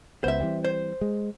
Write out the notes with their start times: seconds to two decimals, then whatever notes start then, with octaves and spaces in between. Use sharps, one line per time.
0.24 C#2 B3 C5 E5
0.40 E3 G3 C4
0.64 C5
1.01 G#3